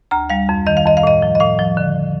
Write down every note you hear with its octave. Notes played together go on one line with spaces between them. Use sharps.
D2 A#5
G3 F5
F2
D#3 D#5
F5
F2 D#5
F5
A2 D#5
F3
D#5
A2 F5
F3
D3